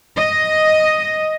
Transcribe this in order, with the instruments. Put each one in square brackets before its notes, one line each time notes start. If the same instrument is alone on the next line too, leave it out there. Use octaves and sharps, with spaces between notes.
[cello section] D#5